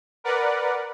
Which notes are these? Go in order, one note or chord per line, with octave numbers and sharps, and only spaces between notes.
A#4 B4 D5 F#5